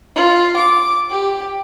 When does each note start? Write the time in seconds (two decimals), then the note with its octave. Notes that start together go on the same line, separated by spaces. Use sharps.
0.15 F4
0.56 D6
1.10 G4